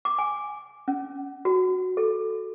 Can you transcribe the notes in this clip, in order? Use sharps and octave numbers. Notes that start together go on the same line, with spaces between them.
D6
G#5
C#4
F#4
A4